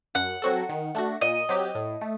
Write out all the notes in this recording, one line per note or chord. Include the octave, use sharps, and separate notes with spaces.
F#2 F#5
F#3 C4 F#4 A4
D#3
A3 D4 F#4
A#2 D#5
F#3 C4 G4
A2
A3